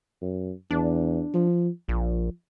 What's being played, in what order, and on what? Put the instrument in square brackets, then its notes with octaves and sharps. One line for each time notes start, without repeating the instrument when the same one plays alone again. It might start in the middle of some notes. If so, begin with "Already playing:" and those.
[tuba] F#2
[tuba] E2 [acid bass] D4
[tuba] F3
[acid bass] A#1 [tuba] F3